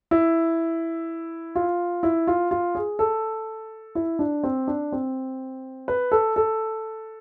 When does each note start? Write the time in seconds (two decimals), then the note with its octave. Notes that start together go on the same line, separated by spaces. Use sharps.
0.11 E4
1.55 F4
2.03 E4
2.27 F4
2.51 F4
2.75 G#4
2.99 A4
3.95 E4
4.19 D4
4.43 C4
4.68 D4
4.92 C4
5.88 B4
6.12 A4
6.36 A4